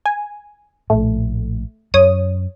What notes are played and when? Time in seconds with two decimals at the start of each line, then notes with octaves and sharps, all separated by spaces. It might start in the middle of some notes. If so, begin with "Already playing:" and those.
0.06 G#5
0.90 A#1 A2 A3
1.94 F#2 C#5 D#6